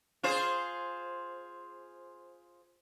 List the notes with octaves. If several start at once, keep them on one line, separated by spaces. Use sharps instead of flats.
F4 G#4 C5